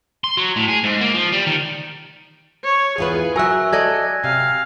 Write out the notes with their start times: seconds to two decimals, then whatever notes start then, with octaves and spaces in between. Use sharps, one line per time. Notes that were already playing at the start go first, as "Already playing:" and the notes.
0.24 C6
0.37 F#3
0.56 A2
0.69 G#4
0.84 G#2
1.01 A#3
1.15 F3
1.32 G3
1.47 D#3
2.64 C#5
2.98 E2 F4 G#4 B4
3.36 F#3 A#4 E5 G#5 E6 F#6
3.73 A4 D5 D#5 G#6 A#6
4.24 C3 F5